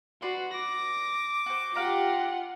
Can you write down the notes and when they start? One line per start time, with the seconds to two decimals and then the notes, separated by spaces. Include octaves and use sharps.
0.22 F#4 B4 D5 C6
0.54 D6 A#6
1.46 F#4 C5
1.75 F4 G4 F5 F#5 A#5